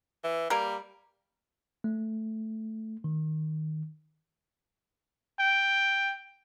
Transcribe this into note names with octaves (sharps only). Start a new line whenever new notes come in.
E3
G3 A#3 A#4
A3
D#3
G5